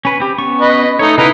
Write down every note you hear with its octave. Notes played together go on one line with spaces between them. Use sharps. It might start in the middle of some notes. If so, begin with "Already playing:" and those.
C#4 B4
C4 G4
B3 C#4 C#6
B4 D#5
A3 D#4 C#5
C#3 B3 D#4 E4 B4 F5